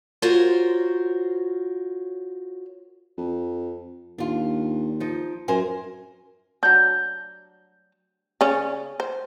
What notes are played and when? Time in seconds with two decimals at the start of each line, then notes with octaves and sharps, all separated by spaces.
0.22 F4 F#4 A#4 C5 C#5
3.18 F2
4.18 D#2 D4 F4
5.00 F3 D#4
5.48 F#2 A#4 C5 G#5
6.63 F#3 D4 G6
8.41 C#3 C#4 D5
9.00 C5